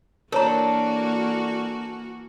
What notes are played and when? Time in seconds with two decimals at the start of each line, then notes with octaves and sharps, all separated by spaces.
0.32 E3 A#3 D4 F#4 A4 A#4 C#5 A#5